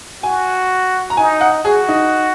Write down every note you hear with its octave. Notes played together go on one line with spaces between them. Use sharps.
F#4 G#5
A#5
D#4 G#5
F#5
F#4 G#4
D#4